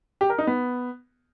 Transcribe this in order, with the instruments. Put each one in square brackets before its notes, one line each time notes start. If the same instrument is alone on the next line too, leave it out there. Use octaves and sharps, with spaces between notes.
[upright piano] G4
A#4
D#4
B3